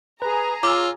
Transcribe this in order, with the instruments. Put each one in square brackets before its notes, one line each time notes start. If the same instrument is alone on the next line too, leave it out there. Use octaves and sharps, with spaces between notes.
[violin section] G#4 A#5 [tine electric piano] B4
[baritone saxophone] F4 [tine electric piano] C#5 E6 [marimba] D6